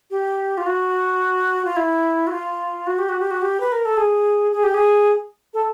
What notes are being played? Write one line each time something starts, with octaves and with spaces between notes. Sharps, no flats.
G4
F4
F#4
F4
E4
F#4
F4
F#4
G4
F#4
G4
F#4
G4
B4
A#4
A4
G#4
G#4
G4
G#4
A4